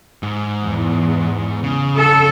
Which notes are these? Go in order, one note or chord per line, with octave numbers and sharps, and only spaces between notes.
G#2
E2
C#3
A4